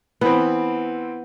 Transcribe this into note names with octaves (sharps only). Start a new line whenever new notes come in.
E3 B3 C4